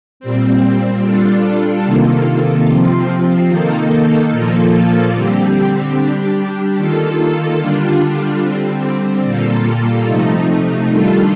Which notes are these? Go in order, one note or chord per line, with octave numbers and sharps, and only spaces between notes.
A#2 G3 C4
G3 D4 F4 A4
C3 D#3 A#3 F4 A4
C3 F3 C4 F4
D#3 A#3 D#4 A4
A#2 F3 A#3 F4 A4
D3 G3 C4 G4
G3 D4 G4
D#3 A#3 F4 A4
D3 G3 D4 F4
D3 G3 C4
A#2 G3 A#3 F4 A4
C3 F3 A3 D#4
D#3 G3 D4 F4 A4